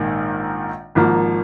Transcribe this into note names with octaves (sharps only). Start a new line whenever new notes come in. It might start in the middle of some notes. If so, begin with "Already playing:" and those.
Already playing: A#1 G#2 D#3 A#3
G#1 G#2 F3 A#3